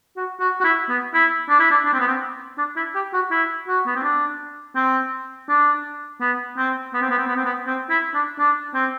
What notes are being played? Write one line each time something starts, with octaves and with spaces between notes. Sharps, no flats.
F#4
F#4
F#4
E4
B3
E4
D4
E4
D4
D4
C4
B3
C4
D4
E4
G4
F#4
E4
F#4
B3
C4
D4
C4
D4
B3
C4
B3
C4
B3
C4
B3
C4
B3
C4
E4
D4
D4
C4